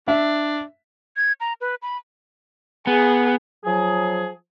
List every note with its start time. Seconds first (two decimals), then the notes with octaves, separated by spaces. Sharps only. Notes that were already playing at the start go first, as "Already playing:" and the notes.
0.08 D4 E5
1.17 G#6
1.40 A#5
1.61 B4
1.82 B5
2.87 B3 G#4
3.64 F3 F#3 G#4